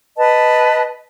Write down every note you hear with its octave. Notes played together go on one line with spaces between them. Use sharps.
B4 D#5 A5